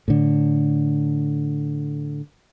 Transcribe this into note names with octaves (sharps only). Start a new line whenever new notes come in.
A2 D3